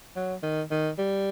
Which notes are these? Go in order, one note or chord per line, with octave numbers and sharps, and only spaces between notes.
F#3
D#3
D#3
G3